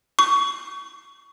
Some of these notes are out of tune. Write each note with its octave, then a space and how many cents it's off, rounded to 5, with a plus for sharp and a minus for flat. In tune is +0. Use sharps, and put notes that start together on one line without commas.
C#6 +25